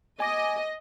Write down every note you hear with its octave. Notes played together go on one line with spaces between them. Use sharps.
D#5 G#5 D6 A#6